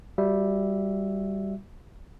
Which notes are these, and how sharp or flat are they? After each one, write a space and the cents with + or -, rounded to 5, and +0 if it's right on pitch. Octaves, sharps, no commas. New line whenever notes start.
G3 +0 F#4 -20 E5 +0